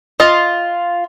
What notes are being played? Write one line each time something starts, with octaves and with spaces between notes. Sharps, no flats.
F4 D#5